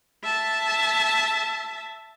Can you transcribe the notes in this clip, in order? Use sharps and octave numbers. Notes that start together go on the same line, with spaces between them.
E5 A5